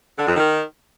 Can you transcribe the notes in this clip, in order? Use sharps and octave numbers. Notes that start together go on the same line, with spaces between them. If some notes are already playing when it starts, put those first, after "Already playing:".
D3
F2
D#3